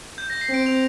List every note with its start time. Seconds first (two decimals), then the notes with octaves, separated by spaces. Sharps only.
0.18 G6
0.30 A#6
0.41 C7
0.49 C4 D7
0.66 F7